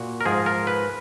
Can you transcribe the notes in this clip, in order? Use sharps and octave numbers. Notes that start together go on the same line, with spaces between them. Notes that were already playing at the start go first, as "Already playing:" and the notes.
Already playing: A#2 F#4
A#4
G#2 F3 G#4
A#4
B4